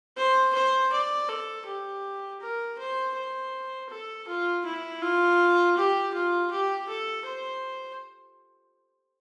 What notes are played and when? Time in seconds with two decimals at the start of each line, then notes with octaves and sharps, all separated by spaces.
0.17 C5
0.54 C5
0.92 D5
1.29 A4
1.66 G4
2.42 A#4
2.79 C5
3.15 C5
3.90 A4
4.27 F4
4.65 E4
5.02 F4
5.77 G4
6.14 F4
6.51 G4
6.88 A4
7.26 C5